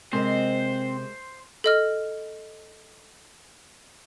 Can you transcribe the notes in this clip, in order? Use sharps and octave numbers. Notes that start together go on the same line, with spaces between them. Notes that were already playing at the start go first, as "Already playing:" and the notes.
C3 G#3 C4 A#4 C5 D#5
A4 D#5 F6